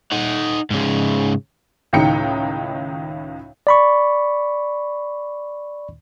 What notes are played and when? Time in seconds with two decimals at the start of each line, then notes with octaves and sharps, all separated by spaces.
0.12 D#4 F#5
0.70 G#2 C#3
1.93 C#2 A2 D#3 D#4 G5 C#7
3.67 D5 B5 C#6